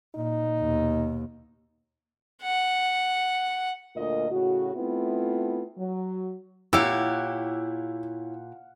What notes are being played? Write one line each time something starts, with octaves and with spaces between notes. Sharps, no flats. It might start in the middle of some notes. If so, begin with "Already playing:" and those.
A#2 D#4
D#2 B2
F#5
D2 A#2 F4 A#4 D#5
A2 C#3 F#4
A3 B3 C4 E4 F4
F#3
A#2 E4 G4 C#5 F5 F#5 E6